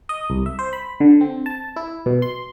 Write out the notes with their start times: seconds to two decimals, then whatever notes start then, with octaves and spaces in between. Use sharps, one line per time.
0.09 D#5
0.30 C2
0.46 E5
0.59 C5
0.73 B5
1.00 D3
1.21 C4
1.46 A5
1.76 E4
2.06 B2
2.22 C6